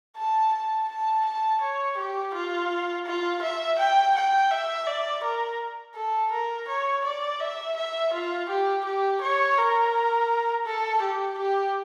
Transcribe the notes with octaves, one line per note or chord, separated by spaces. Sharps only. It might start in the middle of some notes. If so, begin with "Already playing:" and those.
A5
A5
A5
A5
C#5
G4
F4
F4
E5
G5
G5
E5
D5
A#4
A4
A#4
C#5
D5
E5
E5
F4
G4
G4
C#5
A#4
A4
G4
G4